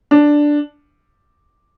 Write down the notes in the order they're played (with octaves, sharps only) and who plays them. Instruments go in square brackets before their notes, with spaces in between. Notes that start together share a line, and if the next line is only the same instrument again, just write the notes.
[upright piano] D4